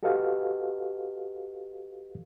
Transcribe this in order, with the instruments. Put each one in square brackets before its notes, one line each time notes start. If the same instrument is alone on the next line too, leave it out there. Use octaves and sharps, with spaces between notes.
[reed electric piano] F#4 G4 A4 B4 D#5 F5